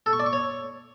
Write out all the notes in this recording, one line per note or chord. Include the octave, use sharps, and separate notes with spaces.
A4
C#6
D5
C#6
C#5